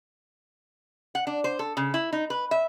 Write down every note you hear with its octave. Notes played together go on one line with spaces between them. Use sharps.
F#5
D4
C5
A4
C#3
E4
D#4
B4
E5